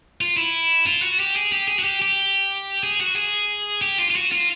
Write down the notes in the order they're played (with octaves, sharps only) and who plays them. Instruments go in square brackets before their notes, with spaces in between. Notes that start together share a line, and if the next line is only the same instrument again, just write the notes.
[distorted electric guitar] F4
E4
F4
F#4
G4
G#4
G4
G#4
F#4
G4
G4
G#4
F#4
G#4
G4
F4
F4
F#4
F4